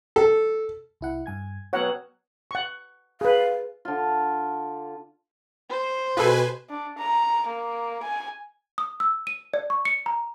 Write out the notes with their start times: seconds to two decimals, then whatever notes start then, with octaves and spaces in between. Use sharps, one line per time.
0.16 A4
1.01 C2 E4 F#5
1.26 G2 G#5 G#6
1.73 B2 F#3 F#4 C#5 F#5 G5 A#5 F6
2.51 F#5 C#6
3.21 G#4 B4 F5
3.85 D3 F4
5.70 C5
6.17 B2 F4 G#4 A4 B4 G#5
6.70 D4
6.98 A#5
7.47 A#3
8.03 G#5
8.78 D#6
9.00 E6
9.27 D#7
9.54 D5
9.70 C#6
9.85 C#7
10.06 A#5